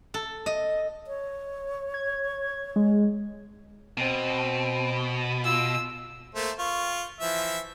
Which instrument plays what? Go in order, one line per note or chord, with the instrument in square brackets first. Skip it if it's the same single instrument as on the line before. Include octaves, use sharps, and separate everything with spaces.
[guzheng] A4
D#5
[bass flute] C#5
[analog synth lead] G#6
G#3
[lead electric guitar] B2 [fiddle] C4
[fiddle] F4 E6
[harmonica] A3 A#3 C5
F4 C#6
E3 F3 E5